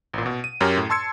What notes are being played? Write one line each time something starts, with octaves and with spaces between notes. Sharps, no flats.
A1 A#2
B2
D#7
F#2 C#4 G4 A#4
A2
A5 C6 E6 G#6 C#7